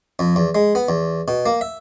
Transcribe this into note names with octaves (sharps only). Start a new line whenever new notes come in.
F2
E2
G#3
B3
E2
B2
A#3
E5